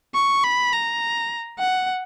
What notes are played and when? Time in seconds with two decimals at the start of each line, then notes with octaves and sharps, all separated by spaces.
0.15 C#6
0.44 B5
0.73 A#5
1.59 F#5